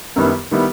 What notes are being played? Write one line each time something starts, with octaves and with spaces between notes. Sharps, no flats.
F#2 D#3 G3 B3 E4
D#3 G3 B3 E4